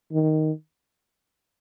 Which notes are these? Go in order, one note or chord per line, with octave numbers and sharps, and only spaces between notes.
D#3